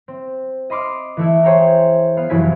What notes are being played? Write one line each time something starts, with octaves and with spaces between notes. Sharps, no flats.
C4
D#5 B5 C6 D6 F6
E3 A3 E4
G#4 C5 C#5 G5 A#5
B3 F5
F1 F#2 E3 E4 G#5 B6